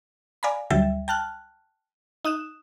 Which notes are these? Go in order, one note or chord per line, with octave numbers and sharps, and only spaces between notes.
D5 F5 G#5 A#5 B5
D2 F#3 G3 E5 G5 A6
G5 A5 F6 F#6
D#4 D#6 F#6 E7